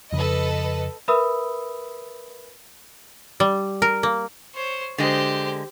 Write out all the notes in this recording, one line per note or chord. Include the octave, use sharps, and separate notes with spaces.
F2 C#3 A4 B4 D#5
A#4 B4 E5 B5 D#6 E6
G3
A#4
A#3
C5 C#5
D3 G#3 G4 C5 D#5